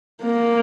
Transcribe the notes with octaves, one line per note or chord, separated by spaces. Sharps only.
A#3